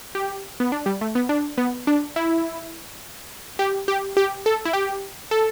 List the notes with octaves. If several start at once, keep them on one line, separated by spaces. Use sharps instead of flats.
G4
B3
D4
G3
A3
B3
D4
B3
D4
E4
G4
G4
G4
A4
E4
G4
A4